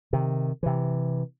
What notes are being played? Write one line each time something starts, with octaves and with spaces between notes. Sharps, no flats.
C3 D#3
C3 E3